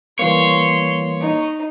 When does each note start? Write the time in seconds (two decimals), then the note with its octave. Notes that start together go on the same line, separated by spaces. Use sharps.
0.19 E3 G3 A#3 C#5 C6
1.21 D#4